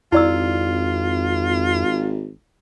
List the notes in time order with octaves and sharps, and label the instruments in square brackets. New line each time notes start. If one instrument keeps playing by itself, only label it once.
[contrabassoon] G#1 [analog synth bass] F2 [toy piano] E4 D5 E6 [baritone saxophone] F4